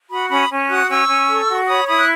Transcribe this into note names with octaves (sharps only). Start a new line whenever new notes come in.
F#4 B5 D#6
C#4 B5 D#6
C#4
F#4 D#6 F#6
C#4 C#6 E6
C#4
A4
F#4
C#5 B5 D#6
E4 B5 D#6
F#6